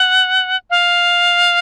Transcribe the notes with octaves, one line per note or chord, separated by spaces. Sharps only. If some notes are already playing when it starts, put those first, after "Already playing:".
Already playing: F#5
F5